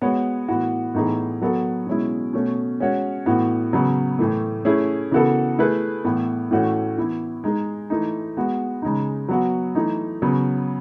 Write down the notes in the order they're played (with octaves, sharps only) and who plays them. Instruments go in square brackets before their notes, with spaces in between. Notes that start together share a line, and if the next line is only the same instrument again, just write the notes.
[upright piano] G#3 B3 F#4 C#5
A2 E3 B3 F#4
A2 E3 B3 D#4 G#4
F#3 B3 F#4 A4
B2 G#3 C#4 E4
B2 A3 C#4
G#3 C#4 F#4 C#5
A2 E3 B3 F#4
C#3 F#3 B3
A2 E3 A3
A3 C#4 E4 G#4
C#3 E3 B3 F#4 A4
A3 E4 G#4 B4
A2 E3 B3
A2 E3 A3 C#4 F#4
E3 B3 E4
G#3 D#4 G#4
E3 A3 D#4
G#3 B3 F#4
C#3 G#3 D#4
F#3 B3 F#4
E3 A3 D#4
C#3 F#3 B3